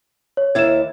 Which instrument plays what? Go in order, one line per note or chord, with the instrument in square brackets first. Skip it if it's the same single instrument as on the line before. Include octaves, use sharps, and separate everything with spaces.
[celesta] C#5
[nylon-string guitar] D#2 E4 D5 [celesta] G#6 E7